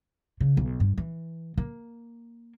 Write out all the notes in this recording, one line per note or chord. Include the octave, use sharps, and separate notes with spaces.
C#3
B1
G2
E3
A#3